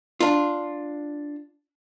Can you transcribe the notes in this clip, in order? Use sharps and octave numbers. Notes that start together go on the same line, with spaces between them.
D4 F4